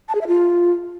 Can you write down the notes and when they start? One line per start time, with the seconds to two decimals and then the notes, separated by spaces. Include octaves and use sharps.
0.09 A5
0.15 G#4
0.21 E5
0.27 F4